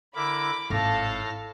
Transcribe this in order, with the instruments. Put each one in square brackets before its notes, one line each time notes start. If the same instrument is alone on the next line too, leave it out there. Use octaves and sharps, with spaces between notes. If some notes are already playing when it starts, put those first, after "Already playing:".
[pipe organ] D3 E4 A#4 [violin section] B5 D6
[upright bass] G#1 [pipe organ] A2 F6 A#6 [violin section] A4 F5 A5